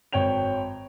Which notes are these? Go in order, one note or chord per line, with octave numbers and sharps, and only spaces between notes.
G#1 C#5 G5 F7